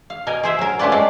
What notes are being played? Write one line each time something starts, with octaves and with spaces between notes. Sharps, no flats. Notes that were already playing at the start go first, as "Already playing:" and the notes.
F5
B2 A#4 D#5 G#5
G#4 C5 E5
F#3 A#4
A3 C#4 F4 B4 D5
G#3 C4 D5